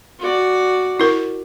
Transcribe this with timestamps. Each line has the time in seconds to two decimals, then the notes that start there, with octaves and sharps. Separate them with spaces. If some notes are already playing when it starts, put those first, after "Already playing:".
0.19 F#4 D5
1.00 E4 A#4